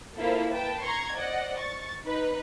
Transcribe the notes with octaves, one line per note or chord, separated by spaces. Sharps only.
A#3 E4 F4 A4 C5
B4 G5 A5
A#5 C6 C#6 G#6
C5 D5 D#5 F#5
C#6 A6
D#4 B4